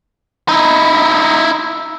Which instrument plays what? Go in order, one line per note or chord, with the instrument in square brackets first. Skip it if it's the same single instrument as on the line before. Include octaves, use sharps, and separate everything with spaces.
[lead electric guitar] D#4 E4